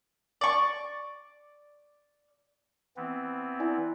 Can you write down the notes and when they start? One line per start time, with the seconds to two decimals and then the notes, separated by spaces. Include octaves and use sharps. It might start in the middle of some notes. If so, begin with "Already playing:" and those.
0.41 D5 C#6
2.97 E3 B3 C4
3.60 E4 D5 G#5